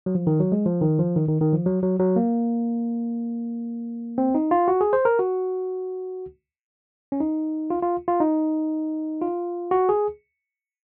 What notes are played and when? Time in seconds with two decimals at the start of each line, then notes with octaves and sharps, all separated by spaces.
0.06 F#3
0.15 F3
0.27 D#3
0.40 F#3
0.52 G#3
0.66 F3
0.82 D#3
0.99 F3
1.16 D#3
1.28 D#3
1.41 D#3
1.53 F3
1.66 F#3
1.83 F#3
1.99 F#3
2.16 A#3
4.18 C4
4.35 D#4
4.51 F4
4.68 F#4
4.81 G#4
4.93 C5
5.05 A#4
5.19 F#4
7.12 C#4
7.20 D#4
7.70 F4
7.82 F4
8.08 F4
8.20 D#4
9.21 F4
9.71 F#4
9.89 G#4